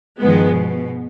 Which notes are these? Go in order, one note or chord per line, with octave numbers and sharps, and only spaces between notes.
G2 D#3 F3 G#3 B3
B2